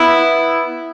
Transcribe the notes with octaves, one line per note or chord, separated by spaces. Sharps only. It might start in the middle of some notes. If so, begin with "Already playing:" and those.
Already playing: B3 E4